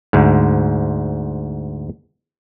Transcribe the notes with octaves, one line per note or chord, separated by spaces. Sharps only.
D2 G#2